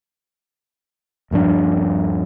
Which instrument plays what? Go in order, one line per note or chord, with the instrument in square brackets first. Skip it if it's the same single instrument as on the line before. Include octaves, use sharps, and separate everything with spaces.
[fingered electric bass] D#1 G2 F3 D4